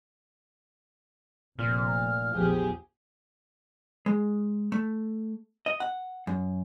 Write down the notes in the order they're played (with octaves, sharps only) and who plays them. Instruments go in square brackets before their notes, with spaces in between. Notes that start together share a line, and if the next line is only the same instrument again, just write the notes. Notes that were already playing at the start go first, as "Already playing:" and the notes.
[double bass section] F1 [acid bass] A#2 [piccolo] F6
[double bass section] A#1 E2 F3 [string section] G4 G#4
[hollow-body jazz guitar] G#3
A3
D#5
F#5
F#2